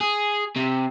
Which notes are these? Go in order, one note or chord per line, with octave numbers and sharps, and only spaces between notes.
G#4
C3